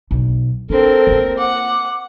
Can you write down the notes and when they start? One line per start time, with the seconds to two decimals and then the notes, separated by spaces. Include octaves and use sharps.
0.11 B1
0.70 C4 D4 A4 A#4
1.07 A#3 E4
1.38 F#5 D6